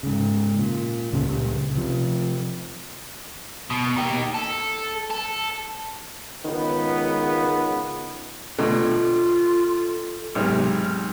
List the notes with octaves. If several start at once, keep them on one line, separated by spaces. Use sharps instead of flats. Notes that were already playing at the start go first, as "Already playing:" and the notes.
G#2 C#3
A#2
C#2 A#2 C#3 G3
C3 F3
B2
D#4 G4
A4
A4
C#2 D#3 B3
B2 D3 A3 F4 A4
B1 G#2 C3 F6